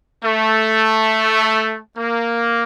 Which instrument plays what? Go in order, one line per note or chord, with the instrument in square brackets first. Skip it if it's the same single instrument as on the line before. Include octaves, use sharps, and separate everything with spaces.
[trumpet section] A3
A#3